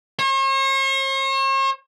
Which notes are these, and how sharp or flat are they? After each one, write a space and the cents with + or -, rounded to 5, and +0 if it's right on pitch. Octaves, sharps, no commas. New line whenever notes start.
C#5 -45